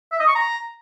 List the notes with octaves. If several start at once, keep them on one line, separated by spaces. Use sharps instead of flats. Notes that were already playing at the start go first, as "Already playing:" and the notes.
E5
D#5
C#6
A#5